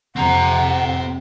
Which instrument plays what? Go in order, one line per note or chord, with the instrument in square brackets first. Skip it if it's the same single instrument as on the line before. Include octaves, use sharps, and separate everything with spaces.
[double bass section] F2 C3 [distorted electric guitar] C4 A#5 [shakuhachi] F#5